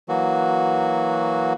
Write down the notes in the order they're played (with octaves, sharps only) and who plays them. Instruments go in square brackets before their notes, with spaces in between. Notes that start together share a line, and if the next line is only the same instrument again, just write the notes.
[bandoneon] E3 F#3 A#3 F#4